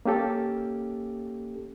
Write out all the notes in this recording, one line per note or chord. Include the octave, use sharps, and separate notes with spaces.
A#3 C#4 G4 A4